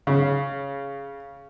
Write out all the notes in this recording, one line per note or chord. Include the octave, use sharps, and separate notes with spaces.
C#3